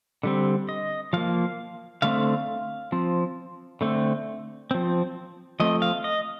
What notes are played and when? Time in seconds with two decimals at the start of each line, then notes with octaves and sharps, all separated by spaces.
0.23 D3 G3 C4
0.69 D#5
1.13 F3 A#3 F5
2.02 D3 A3 C4 F5
2.92 F3 C4
3.81 D3 A3 C4
4.71 F3 C4
5.60 F3 A3 C4 D#5
5.82 F5
6.04 D#5